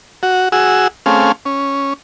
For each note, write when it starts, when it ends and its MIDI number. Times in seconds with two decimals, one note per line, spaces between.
0.23 0.49 66
0.52 0.87 66
0.52 0.87 68
0.52 0.87 88
1.06 1.32 57
1.06 1.32 60
1.06 1.32 61
1.06 1.32 68
1.06 1.32 77
1.45 1.93 61